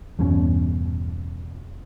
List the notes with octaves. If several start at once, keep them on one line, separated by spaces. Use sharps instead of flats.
E2 G2 B2 C#4